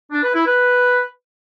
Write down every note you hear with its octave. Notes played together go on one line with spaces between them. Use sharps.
D4
B4
E4
B4